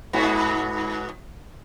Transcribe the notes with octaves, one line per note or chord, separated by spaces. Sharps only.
G#2 B3 F#4